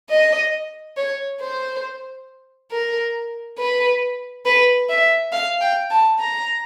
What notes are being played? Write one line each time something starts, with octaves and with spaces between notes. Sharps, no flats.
D#5
C#5
C5
A#4
B4
B4
E5
F5
G5
A5
A#5